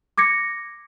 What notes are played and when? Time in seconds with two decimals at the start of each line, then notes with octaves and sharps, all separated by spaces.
0.18 D6 G#6 A#6 C#7